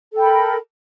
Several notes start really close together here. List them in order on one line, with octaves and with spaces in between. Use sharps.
A4 G5 B5 A#4